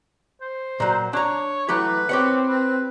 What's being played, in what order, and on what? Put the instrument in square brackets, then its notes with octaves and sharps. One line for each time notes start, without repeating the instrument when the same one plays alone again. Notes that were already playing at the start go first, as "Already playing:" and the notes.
[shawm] C5
[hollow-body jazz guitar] A#2 F#3
[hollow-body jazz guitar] D4 A#5 [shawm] C#5
[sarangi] E3 [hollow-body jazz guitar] F#3 A3 G4 [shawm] B4
[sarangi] C4 [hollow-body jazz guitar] G4 C#5 F#5
[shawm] B4